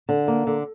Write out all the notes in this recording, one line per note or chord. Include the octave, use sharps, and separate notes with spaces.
D3
A#3
D3